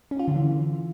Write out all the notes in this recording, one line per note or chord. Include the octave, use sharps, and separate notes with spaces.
C#4
F4
D3
E3